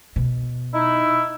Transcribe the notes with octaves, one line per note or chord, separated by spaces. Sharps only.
B2
D#4 E4